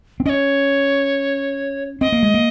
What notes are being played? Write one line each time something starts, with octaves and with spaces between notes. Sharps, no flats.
C4
C#4 C#5 D#5
C4 D#5
A#3
G#3
A#3